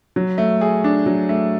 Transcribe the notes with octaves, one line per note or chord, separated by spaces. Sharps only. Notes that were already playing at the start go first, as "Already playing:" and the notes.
F#3
A3
G#4
D4
F#3
A3